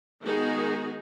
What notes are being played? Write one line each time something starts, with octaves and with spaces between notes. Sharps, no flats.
D#3 G#3 B3 D#4 F#4 G#4